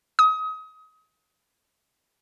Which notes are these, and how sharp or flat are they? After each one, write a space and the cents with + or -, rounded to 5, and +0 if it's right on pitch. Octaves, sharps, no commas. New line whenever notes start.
D#6 +30